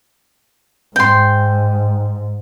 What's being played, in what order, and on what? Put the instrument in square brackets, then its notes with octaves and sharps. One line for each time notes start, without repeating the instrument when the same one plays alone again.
[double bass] G#2 [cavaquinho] G5 C6